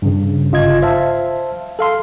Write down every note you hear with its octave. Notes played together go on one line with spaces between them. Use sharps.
G2 C#3
G1 F4 D#5 G#6
C5 E5 F5 A5
A4 F5 C6